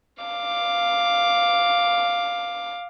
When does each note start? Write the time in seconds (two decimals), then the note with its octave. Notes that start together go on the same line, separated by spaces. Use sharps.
0.23 F5 D6